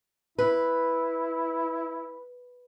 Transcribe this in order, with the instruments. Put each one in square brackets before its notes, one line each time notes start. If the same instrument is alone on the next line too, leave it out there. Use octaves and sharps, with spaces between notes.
[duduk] E4 [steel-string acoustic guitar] B4